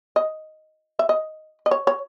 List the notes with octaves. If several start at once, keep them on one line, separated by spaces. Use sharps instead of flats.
D#5
E5
D#5
D#5
C#5
C#5